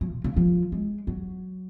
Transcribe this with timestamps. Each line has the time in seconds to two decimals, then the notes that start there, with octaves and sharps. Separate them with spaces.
0.01 F#3
0.12 A#2
0.24 C#3
0.37 F3
0.72 G#3
1.07 F#3